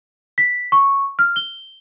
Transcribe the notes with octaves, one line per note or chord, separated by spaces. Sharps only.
B6
C#6
F6
G7